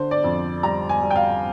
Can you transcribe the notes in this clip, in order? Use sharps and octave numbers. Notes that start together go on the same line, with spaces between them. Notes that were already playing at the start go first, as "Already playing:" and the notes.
Already playing: D3 C5
D5
F2
G3 A#5
G#5
G3
G5
F5